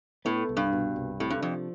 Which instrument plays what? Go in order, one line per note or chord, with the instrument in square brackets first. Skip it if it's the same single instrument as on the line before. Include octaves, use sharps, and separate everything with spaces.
[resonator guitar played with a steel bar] A2 [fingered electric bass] B3
[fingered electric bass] C2
[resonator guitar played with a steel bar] G2
[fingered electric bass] B2
C2
[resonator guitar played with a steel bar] A2 [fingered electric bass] C3
[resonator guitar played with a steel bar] G2
[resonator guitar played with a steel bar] F2 [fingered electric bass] F3